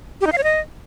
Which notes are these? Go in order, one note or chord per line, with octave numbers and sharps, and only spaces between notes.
G4
D#4
F5
C#5
D#5